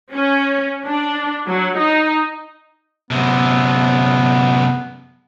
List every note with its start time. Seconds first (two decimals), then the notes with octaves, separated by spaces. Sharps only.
0.12 C#4
0.86 D4
1.47 F#3
1.78 D#4
3.11 F#2 C3 B3